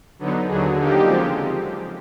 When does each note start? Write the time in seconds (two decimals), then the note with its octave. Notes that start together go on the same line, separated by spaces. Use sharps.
0.19 D3 F#3 B3 D#4
0.47 D#2 D3 F#3 G#4
0.76 D3 F3 A#3 D#4 G4
1.03 C#3 F3 G#3 C4